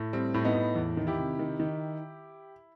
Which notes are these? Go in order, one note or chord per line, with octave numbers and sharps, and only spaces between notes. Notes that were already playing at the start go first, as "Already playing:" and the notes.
Already playing: A2
G3 C4
A2
B3 D#4
A2
E2
D#3
E4 G4
C3
D#3
D#3